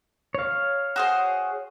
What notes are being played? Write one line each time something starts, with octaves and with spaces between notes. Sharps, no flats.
C#5 F5
F#4 G#4 C5